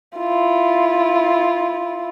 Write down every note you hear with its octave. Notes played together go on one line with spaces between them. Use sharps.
E4 F4